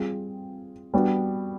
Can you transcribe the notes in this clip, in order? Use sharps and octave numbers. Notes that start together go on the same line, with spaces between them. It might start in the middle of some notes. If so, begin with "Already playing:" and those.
Already playing: G3 C4 F4 G#4
G3 B3 D4 F#4